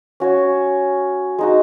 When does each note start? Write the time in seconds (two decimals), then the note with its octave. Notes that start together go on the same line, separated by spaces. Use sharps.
0.20 C#4 F#4 C#5
1.38 G#3 D#4 F#4